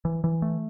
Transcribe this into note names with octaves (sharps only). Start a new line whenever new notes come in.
E3
E3
A3